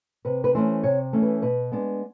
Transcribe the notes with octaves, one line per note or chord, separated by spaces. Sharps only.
C3 B4
B4
E3 A3 C#4 C5
C3 C#5
E3 A3 C#4
B4
B2 B4
G#3 B3 D4